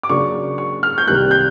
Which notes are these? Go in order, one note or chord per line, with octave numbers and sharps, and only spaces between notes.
D6
C#3 F#3 A#3 D4 C#6
C#6
F6
G6
C2 C3 D#3 G3 A#3 F#6
G6